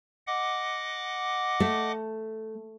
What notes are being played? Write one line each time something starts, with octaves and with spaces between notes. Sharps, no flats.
D#5 F#5 D6
A3